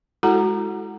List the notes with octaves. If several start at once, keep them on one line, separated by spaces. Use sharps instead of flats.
G#3 E4 F#4 A4 F#5 A#5